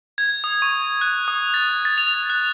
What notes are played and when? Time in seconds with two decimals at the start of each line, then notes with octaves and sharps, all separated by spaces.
0.18 G#6
0.44 D#6
0.62 C#6
1.01 F#6
1.28 D#6
1.54 A6
1.85 A6
1.98 F7
2.30 F#6